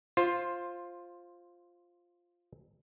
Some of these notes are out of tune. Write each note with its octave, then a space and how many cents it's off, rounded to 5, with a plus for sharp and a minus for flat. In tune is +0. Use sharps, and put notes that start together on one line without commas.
F4 +0 C5 +15